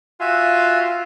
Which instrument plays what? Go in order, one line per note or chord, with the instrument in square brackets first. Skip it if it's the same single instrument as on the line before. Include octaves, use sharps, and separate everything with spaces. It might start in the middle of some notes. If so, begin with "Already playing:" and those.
[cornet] F4 [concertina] F#4 E5 G#5